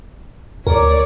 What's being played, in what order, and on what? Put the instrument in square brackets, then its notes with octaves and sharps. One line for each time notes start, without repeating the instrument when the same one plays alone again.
[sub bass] D2 [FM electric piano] A#4 [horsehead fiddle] C#5 D5